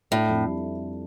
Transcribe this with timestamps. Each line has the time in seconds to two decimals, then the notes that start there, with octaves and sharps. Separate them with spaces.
0.11 A2 D4
0.29 F2
0.46 G3